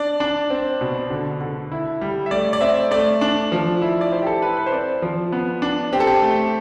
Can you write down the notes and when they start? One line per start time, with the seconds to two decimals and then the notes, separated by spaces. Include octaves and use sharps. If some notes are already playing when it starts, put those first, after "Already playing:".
Already playing: D4 D5
0.20 D4
0.50 C4
0.81 B2
1.10 D3
1.41 D3
1.72 E4
2.01 G3
2.26 E5
2.31 A3 D5
2.53 D5
2.61 C4 E5
2.91 A3 D5
3.21 D4
3.52 F3
3.82 E4
4.01 D5
4.12 E4 C5
4.22 G4
4.27 A4
4.42 E4 B4
4.57 B4
4.66 C5
4.72 C4 D5
5.02 F3
5.32 B3
5.62 D4
5.93 C4 G4
6.00 A4
6.07 G4
6.22 A3